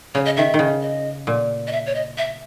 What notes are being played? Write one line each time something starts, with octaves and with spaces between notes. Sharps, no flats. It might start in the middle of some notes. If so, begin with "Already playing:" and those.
C#3 C#5
D#5
D#3 E5
D#3
C#3
D#5
A#2
D#5
E5
C#5
D#5
E5